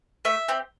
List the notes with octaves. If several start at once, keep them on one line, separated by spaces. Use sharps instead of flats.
A3 E5
C4 G4